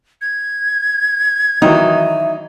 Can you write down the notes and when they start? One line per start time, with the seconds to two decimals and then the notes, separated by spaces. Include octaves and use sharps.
0.21 G#6
1.62 D#3 E3 F#3 D#4 E5